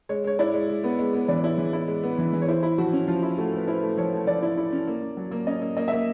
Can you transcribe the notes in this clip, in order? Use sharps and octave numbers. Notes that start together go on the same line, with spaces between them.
G#3 C#5
G#3 C#5
E4 D5
G#3
G#3
B3
G#3
B3
E3 D5
E4
E3
E4
G#3
B3
E3
E3
C#5
E4 C5
E4
F3 F#4
C#4
F3 F4
E4
A3 F#4
A3 B4
E4 C5
A3
F3 C#5
A3
F3 D5
E4
E4
C#4
A#3
A#3
F#3
A#3
C#4 D#5
A#3
A#3 D#5
A#3 E5